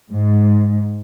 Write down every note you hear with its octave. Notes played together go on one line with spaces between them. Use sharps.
G#2